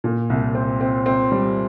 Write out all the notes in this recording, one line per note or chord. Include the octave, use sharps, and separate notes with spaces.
A#2
C2
C4
C4
C4
G3